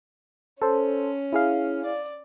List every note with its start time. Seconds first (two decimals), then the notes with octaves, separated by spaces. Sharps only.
0.62 C#4 A4 C5
1.32 E4 G#4 F5
1.85 D5